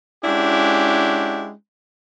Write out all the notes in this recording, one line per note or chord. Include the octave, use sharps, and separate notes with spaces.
G#3 C#4 D4 E4 F#4 G4